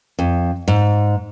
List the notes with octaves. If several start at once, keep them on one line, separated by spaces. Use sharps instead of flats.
F2
G#2